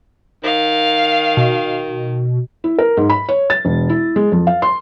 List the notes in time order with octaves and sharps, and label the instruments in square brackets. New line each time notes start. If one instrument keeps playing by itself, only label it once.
[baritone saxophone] D#3 [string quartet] F5
[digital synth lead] B2
[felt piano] E4
A#4
G#2
B5
C#5
A6
E1
E4
G#3
F2
F5
C6